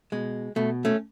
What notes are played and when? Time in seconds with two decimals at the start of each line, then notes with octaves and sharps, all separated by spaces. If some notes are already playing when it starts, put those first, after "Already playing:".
0.12 B2 G#3
0.56 B2 A3
0.85 A3 C#4